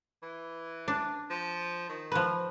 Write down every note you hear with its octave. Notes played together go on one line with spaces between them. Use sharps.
E3
D4
F3
D#3
F3 B4